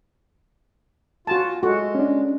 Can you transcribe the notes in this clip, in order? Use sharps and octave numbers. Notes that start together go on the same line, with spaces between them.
F4 F#4 G#5 A5
G#3 F#4 A4
C#4 D4